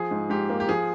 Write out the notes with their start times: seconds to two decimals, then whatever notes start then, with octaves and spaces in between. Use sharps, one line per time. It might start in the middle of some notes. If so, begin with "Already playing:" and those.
Already playing: F3 G#4
0.11 G#2
0.30 G#2 G4
0.50 A#3
0.60 G4
0.68 F3 G#4